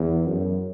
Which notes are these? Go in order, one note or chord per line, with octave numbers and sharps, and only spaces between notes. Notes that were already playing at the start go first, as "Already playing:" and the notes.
Already playing: E2
F#2